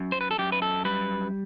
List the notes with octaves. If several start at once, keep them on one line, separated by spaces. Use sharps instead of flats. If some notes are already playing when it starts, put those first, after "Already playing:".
Already playing: F#2
C5
B4
A4
F#2 G4
B4
A4
G3 B4